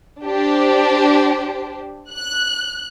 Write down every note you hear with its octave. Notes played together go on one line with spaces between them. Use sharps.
D4 G4 C5
F#6